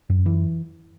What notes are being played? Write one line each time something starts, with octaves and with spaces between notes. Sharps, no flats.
F#2
E3